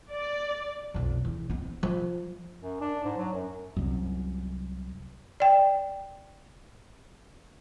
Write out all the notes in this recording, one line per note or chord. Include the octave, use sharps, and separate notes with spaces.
D5
B1 F2
E2
B3 C4
F3
F#2
D4
G#2
F#3
F#2
C2 F#2
D5 G5